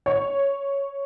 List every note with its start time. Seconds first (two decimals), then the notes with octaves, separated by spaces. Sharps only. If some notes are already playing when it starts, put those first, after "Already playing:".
0.06 C#5